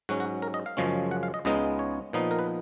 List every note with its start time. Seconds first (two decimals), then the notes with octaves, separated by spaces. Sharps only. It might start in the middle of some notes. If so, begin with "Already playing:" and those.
0.09 G#2 F#3 C#4 F#4
0.20 F#4
0.42 A#4
0.54 D#5
0.66 F5
0.77 F#2 C#3 F3 G#3 C#4
1.11 F#5
1.23 F5
1.34 D#5
1.45 C#2 C#3 G#3 B3 D#4 D#5
1.79 C#5
2.13 A#2 F3 B3 D#4
2.31 A#4
2.39 B4